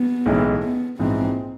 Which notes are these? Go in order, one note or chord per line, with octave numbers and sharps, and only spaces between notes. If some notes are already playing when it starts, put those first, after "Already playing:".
Already playing: B3
B1 A2 E3 G#3 C#4
B3
A#1 G#2 E3 C4